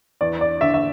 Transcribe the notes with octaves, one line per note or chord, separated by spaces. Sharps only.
E2 D5
D5
D3 E5
E5